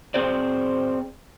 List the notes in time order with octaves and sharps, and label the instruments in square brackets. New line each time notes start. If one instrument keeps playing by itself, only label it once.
[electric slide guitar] C4 G#4 C5 D5